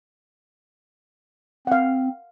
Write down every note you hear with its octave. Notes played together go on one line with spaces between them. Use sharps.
C4 F5 F#5